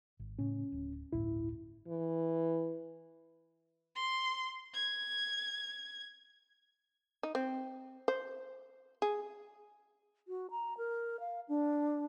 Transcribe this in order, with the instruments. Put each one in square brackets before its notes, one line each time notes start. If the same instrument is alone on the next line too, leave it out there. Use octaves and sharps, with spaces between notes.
[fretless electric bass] G#1
[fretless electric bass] A2 C#3 [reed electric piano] C#4
[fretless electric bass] D1
[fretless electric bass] D1 G1 A2 [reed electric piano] E4
[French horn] E3
[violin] C6
G#6
[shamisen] D#4
C4
C5
G#4
[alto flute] F#4
A#5
A#4
F5
D4